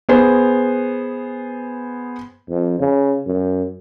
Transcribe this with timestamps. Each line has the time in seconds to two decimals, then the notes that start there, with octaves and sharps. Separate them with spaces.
0.09 B3 G#4 C5
2.49 F2
2.80 C#3
3.26 F#2